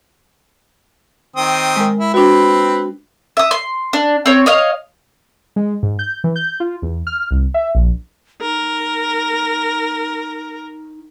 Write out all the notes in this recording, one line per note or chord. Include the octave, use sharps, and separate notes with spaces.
D#3 C4 D#6
G#3 A#4
E4
C4 D4 F#4 B4
E5 D#6
C6
D4
C4 C#5
C#5 D#5 F5
G#3
G#2
G6
E3
G6
F4
E2
F6
C2
E5
A#1
D#4 A#4